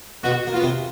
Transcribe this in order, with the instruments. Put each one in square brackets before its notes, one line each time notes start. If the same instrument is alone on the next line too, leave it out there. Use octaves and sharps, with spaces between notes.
[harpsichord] B2 B3 [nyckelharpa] F#4
[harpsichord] A#3
[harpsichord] B3 [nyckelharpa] F4
[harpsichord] C3 C4